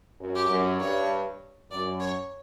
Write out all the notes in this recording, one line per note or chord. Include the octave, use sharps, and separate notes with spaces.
F#2
G4
F#2
G2 C#5
F#2 D5
C#5